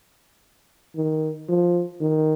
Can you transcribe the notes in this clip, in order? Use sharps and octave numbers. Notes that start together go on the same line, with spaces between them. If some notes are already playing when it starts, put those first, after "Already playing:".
D#3
F3
D#3